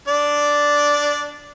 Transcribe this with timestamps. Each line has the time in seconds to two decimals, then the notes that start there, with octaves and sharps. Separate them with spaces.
0.08 D4 D5